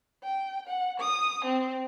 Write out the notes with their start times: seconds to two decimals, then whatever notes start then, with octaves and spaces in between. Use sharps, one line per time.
0.23 G5
0.68 F#5
1.00 D#6
1.45 C4